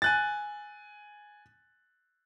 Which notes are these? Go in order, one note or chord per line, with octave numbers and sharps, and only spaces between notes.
G#5 F#6 A6